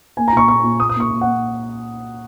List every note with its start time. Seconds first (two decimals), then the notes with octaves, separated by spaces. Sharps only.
0.17 A#3 G#5
0.28 A#5
0.32 A#2 C#6
0.48 A#2 C#6
0.63 A#2
0.79 A#3 D#6
0.89 D#6
0.96 A#3 C#6
1.10 A#2
1.21 A#2 F#5